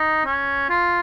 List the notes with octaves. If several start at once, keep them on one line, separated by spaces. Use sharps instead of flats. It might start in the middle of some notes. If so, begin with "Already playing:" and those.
Already playing: D#4
C#4
F4